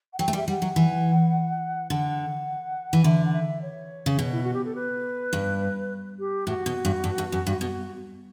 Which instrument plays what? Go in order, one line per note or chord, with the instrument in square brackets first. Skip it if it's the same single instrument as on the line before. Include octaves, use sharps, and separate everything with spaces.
[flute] F#5
[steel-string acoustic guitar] F#3 [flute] G5
[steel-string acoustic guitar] A3
G3
[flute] E5
[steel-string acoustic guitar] G3 [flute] F#5
[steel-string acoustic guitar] F#3
E3
[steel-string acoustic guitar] D3 [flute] F#5
[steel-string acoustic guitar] E3
[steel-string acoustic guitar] D3 [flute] E5
[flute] F#5
E5
C#5
[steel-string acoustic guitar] C#3
B2
[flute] E4
F#4
G4
A4
B4
[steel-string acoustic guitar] G2
[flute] G4
[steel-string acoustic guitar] A2 [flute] F#4
[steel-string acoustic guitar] B2
G2
G2
G2
F#2
G2
[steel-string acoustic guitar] B2 [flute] F#4